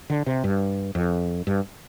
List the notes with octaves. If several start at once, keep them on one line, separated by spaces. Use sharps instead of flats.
D3
C3
G2
F2
G2